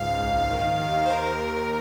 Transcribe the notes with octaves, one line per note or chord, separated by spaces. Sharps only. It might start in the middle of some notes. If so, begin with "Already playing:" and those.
Already playing: C#2 G#2 F5
A#1
D#3
D#2
C5
D#2 A#4
D#2